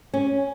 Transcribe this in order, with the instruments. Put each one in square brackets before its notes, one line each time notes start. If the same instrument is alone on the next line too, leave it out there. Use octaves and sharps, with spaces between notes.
[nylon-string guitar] C#4